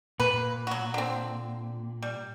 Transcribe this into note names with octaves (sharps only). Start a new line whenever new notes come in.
A#2 B4
F#3 F#4
D3 C4
G3